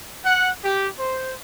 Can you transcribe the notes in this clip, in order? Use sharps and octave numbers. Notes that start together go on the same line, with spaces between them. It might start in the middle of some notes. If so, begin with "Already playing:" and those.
F#5
G4
C5